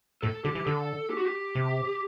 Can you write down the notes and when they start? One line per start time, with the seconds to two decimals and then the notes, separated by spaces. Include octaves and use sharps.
0.22 A2 A4
0.45 D3 G4
0.55 E3
0.66 D3 A4
1.10 G4
1.18 F#4
1.26 G4
1.55 C3